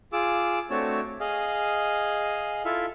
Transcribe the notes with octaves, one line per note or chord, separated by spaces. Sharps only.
F4 G#4 D6 E6
A3 C4 D4 F#4 C#5 A5
G#4 D#5 F5
E4 F4 A4 E5 F5